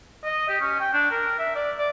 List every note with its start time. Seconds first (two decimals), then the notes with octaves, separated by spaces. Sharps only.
0.24 D#5
0.49 G4
0.61 C#4
0.80 G5
0.93 D4
1.11 A#4
1.39 E5
1.56 D5
1.78 D5